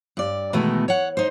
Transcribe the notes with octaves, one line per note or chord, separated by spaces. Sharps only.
G2 D5
B2 D#3 E3 G#3 A3 B3
C#5 F#5
D#4 C5